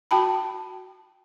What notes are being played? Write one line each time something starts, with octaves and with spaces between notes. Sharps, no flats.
F#4 G5 A5 B5